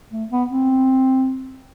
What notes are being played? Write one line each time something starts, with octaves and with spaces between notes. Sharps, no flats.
A3
B3
C4